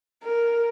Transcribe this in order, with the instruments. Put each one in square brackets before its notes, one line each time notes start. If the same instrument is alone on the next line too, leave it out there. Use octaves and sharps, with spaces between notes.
[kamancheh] A#4